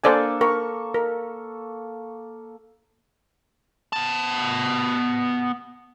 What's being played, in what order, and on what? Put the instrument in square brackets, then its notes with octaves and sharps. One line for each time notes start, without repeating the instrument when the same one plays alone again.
[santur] A#3 D4 A4 [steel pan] C5 D5 G#5
[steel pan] A#4 [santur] C#6
[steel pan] A#4
[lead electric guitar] B3 A5